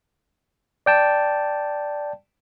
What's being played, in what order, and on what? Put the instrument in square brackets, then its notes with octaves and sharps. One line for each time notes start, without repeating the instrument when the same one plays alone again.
[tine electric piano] D5 G5 A5